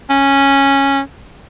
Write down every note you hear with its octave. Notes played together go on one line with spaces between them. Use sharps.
C#4